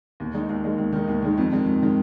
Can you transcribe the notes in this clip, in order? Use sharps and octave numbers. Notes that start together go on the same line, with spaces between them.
D#2
D#3 G#3 D#4
D#2
D#3 G#3 D#4
D#2
D#3 G#3 D#4
D#2
D#3 G#3 D#4
F2
D#3 G#3
F2
D#3 G#3